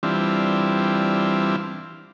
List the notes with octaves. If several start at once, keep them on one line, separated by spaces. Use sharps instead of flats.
E3 G3 C4 D4 E4 F4